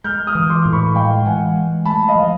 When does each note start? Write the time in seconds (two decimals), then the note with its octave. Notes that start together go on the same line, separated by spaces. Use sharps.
0.04 G#3 F6 G6
0.27 D#6 F6
0.35 E3
0.50 C6 D6
0.65 A2
0.73 B5 C#6
0.95 G#3 F5 G5
1.25 E3 F#5 G#5
1.55 G#3
1.85 A3 A5 B5
2.08 D#5 F5
2.16 F3